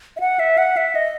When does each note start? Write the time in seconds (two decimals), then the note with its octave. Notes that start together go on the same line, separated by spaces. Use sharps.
0.17 E5
0.20 F#5
0.39 E5
0.58 F#5
0.77 E5
0.95 D#5